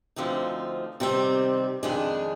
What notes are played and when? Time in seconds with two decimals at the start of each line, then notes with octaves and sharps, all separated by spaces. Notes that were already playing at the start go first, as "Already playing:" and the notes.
0.16 D2 D3 F3 C4 D#4
1.00 C3 D#3 G3 C4
1.83 F2 D#3 G#3 D4 G#4